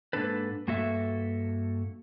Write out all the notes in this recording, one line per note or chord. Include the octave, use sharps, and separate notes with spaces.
G#2 E3 A#3 D4 A4 B4
G2 A#3 F#4 A4 E5